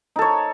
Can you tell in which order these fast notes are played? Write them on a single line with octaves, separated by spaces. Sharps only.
D#4 A4 C#5